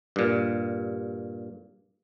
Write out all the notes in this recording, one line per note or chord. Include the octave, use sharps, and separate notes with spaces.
G2 A#2